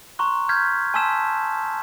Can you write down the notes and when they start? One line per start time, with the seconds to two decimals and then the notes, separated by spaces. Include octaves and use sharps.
0.19 A#5 C6 C#6 F#6
0.49 F6 G6 G#6 B6
0.94 G#5 A5 C6 E6 B6 E7